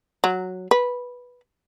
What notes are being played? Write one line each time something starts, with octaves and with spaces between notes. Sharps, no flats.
F#3
B4